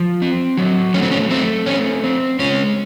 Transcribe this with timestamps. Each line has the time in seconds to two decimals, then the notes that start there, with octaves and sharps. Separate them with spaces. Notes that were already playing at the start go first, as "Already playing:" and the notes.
Already playing: F3
0.22 C4
0.58 F#3
0.94 A3 C#4
1.03 C4
1.11 C#4
1.30 A3 C4
1.66 C4 C#4
2.04 C4
2.39 G#3 C#4